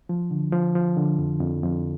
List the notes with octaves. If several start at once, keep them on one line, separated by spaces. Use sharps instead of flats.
F3
D3
F3
F3
D3
F2
F2
F2